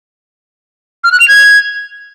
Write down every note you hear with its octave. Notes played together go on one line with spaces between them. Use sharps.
F6
F#6
F7
G#6